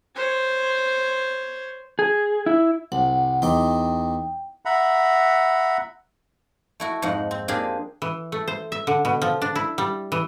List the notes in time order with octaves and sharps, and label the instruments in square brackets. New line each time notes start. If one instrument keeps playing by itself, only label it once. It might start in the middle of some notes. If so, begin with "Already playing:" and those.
[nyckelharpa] C5 C#5
[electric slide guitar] G#4
E4
[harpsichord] C2 [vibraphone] F#5
[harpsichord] E2 D#4 D6 [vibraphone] G5
[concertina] E5 F#5 A#5 B5
[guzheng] A3 E4 F#4
F2 G#2 F3 D#4 F#5
C4
A#3 C4 D4 G4 G#4 F5
[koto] E3
A3
C5
E5
D3
B2
F3
D4
E4
G3
E3